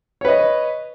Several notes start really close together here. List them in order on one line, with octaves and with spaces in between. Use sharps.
C#5 B4 D#5